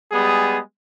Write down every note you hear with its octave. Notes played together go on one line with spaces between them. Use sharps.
G3 G#3 B3 G#4